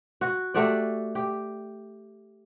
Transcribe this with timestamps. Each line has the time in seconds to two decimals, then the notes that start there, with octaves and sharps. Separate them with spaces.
0.21 F#4
0.54 A3 F#4 G4 D5
1.15 G4